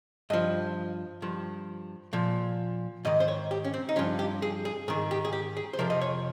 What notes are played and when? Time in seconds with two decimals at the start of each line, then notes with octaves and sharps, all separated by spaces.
0.30 G2 F3 D#5
1.22 G2 F3
2.13 A#2 F3
3.05 G#2 D#3 D#5
3.20 C5
3.28 C#5
3.51 G4
3.64 C#4
3.74 C4
3.89 D#4
3.96 G2 F3 C#4
4.19 G4
4.42 G#4
4.65 G#4
4.88 G#2 D#3 G#4
5.11 G4
5.25 G#4
5.33 G4
5.57 G#4
5.73 C5
5.79 F2 C3 F3 A#4
5.90 D#5
6.01 C#5